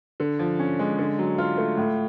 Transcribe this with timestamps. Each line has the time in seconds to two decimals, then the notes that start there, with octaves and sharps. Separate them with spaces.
0.20 D3
0.39 F3
0.59 C#4
0.79 G#3
0.98 D3
1.19 F#3
1.38 F4
1.57 A3
1.78 A2